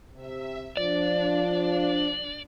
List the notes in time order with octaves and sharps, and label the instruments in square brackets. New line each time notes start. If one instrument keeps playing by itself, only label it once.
[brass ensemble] C3 [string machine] E5
[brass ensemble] F3 [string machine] D4 [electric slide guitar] D5